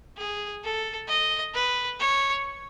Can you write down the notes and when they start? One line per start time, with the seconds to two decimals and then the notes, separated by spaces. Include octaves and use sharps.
0.18 G#4
0.64 A4
1.09 D#5
1.55 B4
2.00 C#5